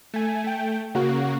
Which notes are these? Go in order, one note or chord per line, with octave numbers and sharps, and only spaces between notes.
A3 G#5
A3 G5
C#3 A#3 F#4